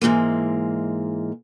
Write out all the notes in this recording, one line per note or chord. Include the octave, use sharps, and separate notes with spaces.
G#2 E3 G#3 A#3